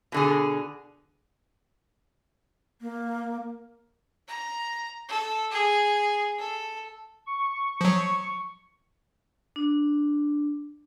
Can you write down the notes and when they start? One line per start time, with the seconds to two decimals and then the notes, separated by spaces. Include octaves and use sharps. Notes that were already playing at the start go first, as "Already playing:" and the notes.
0.12 B2 D3 G#4
2.81 A#3
4.28 A#5
5.08 A4
5.51 G#4
6.38 A4
7.27 C#6
7.81 F3 F#3
9.56 D4